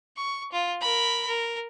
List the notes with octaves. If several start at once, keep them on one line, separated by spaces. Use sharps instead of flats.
C#6
F4
A#4 B5
A#4